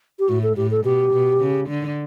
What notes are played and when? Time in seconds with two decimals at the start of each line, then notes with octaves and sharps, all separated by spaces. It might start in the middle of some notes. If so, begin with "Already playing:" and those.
0.19 G4
0.29 A2 F#4
0.43 A4
0.57 A2 G4
0.71 A4
0.85 B2 G4
1.13 B2
1.40 C#3
1.69 D3